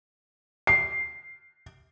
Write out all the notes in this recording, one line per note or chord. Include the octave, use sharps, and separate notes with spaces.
C7